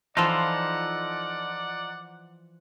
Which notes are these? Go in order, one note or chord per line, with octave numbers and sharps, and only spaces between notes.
E3 F3 D#4 F4 A4 D5 F#5